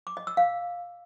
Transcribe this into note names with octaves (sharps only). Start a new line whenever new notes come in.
D6
D#5
E6
F5